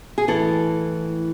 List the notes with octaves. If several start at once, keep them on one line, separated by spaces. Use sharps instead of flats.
G#4
A2 E3 A4